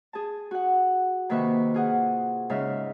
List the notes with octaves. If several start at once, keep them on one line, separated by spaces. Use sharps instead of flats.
G#4 A5
F#4 F#5
C3 D#3 A#3 B4 E5 C#6
F4 G#4 F#5
G#2 C#3 E5 F5